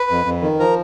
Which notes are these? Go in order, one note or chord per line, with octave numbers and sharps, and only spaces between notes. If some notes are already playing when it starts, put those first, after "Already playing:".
Already playing: B4
F2
F2
D#3
F3 A#4